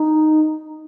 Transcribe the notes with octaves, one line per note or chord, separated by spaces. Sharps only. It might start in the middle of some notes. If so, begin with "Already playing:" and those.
Already playing: D#4